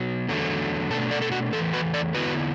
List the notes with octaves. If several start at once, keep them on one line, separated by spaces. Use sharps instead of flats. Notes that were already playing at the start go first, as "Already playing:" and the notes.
Already playing: B2 F#3
E2 D3 F#3 A3
B2 A3 D4 A4
A4 D5
A4
F#4
E2 E3 A3 A4
F#4 B4
A4 D5
E2 D3 B3 E4 F#4 B4